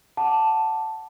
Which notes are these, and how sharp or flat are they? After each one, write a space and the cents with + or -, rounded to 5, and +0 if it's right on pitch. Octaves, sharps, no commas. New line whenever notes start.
F#5 +0 A5 +0 D6 +0